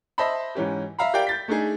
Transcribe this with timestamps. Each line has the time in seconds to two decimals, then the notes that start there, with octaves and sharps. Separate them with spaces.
0.18 C5 D#5 E5 A5 B5
0.55 G#2 E3 C#4 G4
0.98 E5 F5 A#5 B5
1.14 G4 A#4 D5 F5 G5
1.27 G6 A6 B6
1.48 A3 D4 D#4 G#4